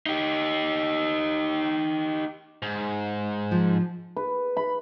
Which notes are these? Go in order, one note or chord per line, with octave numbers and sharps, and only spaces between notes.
D#4 G4
G#2
F3
B4
B5